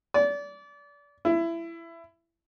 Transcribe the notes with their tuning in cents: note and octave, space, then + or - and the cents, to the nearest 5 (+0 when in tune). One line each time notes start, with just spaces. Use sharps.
D5 -30
E4 +20